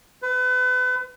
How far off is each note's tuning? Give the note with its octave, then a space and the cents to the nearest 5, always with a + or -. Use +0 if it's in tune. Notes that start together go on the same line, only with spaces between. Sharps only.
B4 +35